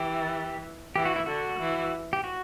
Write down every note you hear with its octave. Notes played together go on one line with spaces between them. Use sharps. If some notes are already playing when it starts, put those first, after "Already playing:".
Already playing: E3 G4
E3 G4
F#4
E4
D3 F#4
E3
G4
F#4